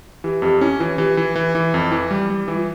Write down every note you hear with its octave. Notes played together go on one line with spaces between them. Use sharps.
E3 G4
F2 G4
C#4 E4
E3 F4
E3 G4
E3
E3
E3
F2
E3
G3
G3
E3 E4
F4